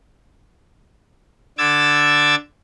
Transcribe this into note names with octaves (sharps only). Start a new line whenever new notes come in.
D3 D6 E6 G#6 A6